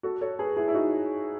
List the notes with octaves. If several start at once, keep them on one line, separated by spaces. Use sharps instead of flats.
F#4 A4
A4 C#5
G#4 B4
E4 G#4
E4
D#4 F#4